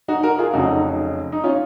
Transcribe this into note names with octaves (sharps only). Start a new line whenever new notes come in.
D#4 F#4
F#4 A#4
F4 G#4
F1 F2 C#3 F#3 D#4 F#4
D#4
C#4 F4